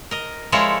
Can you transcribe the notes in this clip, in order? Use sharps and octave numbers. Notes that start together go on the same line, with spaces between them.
A#4 D#5
F3 G#3 E4 A4 A#4 C#5